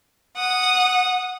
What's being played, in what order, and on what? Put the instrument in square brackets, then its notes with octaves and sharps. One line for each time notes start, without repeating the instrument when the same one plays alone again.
[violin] F#5 D#6